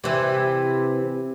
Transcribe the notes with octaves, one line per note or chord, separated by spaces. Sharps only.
C3 E3